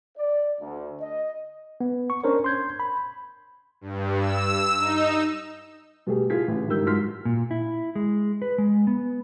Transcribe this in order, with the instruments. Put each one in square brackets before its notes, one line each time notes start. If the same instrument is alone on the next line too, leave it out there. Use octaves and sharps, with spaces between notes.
[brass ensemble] D5
D2
D#5
[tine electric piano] B3
C#6
C#4 D4 A#4 C5 C#5
C6 G6 G#6
B5
[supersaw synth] G2
E6
D#4
[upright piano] B2 G3 A3 G4 G#4
E4 F4 G#4 A4 G#6 B6
A1 A2 C#3
G#1 G2 G4 A#4 E6 G6
G#2 F#3 F4 C6 F6 B6
[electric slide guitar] A#2
E4
G#3
B4
G#3
B3